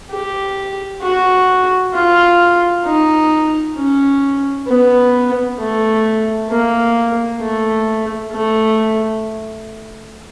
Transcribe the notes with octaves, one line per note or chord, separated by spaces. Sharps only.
G4
F#4
F4
D#4
C#4
B3
A3
A#3
A3
A3